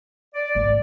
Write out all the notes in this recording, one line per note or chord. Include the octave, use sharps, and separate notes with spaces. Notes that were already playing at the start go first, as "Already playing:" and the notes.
D5
G#1